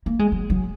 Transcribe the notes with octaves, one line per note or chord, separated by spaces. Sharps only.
A#3
G#3
F#3
F#3